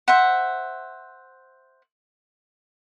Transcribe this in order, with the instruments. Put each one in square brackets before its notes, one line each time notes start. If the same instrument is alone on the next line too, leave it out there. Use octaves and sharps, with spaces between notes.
[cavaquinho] C5 E5 F#5